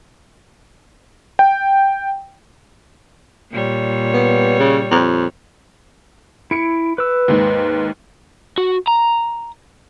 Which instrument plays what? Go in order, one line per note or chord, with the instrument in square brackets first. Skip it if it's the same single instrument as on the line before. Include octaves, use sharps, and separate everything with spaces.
[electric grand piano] G5
[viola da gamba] A#2 G3 C#5
[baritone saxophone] B3
C#3
F2
[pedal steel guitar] E4 [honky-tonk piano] C#7 D7
[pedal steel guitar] B4 E6
[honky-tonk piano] D#2 G#2
[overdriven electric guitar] F#4
A#5